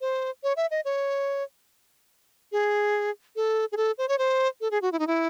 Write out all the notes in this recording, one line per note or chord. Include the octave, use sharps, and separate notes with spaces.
C5
C#5
E5
D#5
C#5
G#4
A4
G#4
A4
C5
C#5
C5
A4
G#4
F#4
E4
D#4
E4